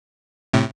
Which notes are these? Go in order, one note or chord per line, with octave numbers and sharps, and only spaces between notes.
A2 C3